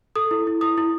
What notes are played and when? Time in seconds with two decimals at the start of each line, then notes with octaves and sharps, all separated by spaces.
0.16 A4 D#6
0.31 E4
0.47 E4
0.61 E4 D#6
0.78 E4